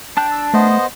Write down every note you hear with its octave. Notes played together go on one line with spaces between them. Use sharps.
D4 G5 A5 F#6
E6
A3 B3 C5 D#5